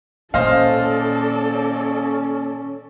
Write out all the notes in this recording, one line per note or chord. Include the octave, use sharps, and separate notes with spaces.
A#2 D#3 C#4 A4 C5 D5 D#5 F5